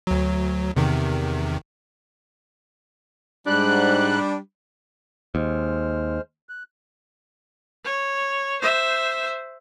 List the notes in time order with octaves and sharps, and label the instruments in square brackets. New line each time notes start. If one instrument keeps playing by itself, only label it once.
[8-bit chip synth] D2 F#3
E2 C3 D#3
[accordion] G#2 F#6 [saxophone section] G3 D4
[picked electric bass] D#2 [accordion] G#3 C5 F6
[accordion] F#6
[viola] C#5
C5 E5